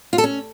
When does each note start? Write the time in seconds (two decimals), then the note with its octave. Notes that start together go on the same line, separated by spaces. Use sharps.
0.13 F4
0.18 A4
0.24 C#4